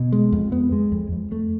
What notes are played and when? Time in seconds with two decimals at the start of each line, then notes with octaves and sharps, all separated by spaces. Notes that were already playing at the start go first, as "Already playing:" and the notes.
Already playing: B2
0.12 G#3
0.32 F2
0.52 B3
0.72 G#3
0.92 F2
1.12 F2
1.32 A3